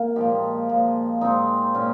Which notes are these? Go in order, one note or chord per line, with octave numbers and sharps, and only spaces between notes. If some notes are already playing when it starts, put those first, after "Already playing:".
Already playing: A#3
A#2 F3 G#3 D#4 G4
A#2 F3 G#3
A#2 G#3 C4 D#4
A#2 C#4